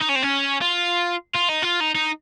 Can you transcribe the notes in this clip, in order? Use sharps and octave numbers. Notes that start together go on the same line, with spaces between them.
D#4
C#4
C4
C#4
F4
F4
D#4
F4
D#4
D#4